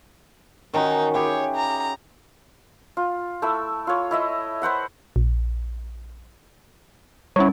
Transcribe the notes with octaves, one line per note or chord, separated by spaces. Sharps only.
D#3 C#4 D#4 F#4
E4 G4 G#4 C#5
A#5
F4
A3 E4 E6
F4 C#5
E4 D#5 E5
B4 C5 F#5 B5
A#1
G3 C#4 E4 C#5